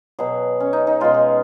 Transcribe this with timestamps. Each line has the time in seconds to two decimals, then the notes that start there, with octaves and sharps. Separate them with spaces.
0.19 B2 F#3 G#4
0.60 C#4
0.73 D#4
0.87 D#4
1.00 B2 G#3 F4
1.14 G#4